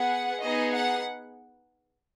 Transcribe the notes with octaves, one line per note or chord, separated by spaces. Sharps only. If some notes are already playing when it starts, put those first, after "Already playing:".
Already playing: B3 G#4 F#5
B3 D#4 G#4 D#5
F#5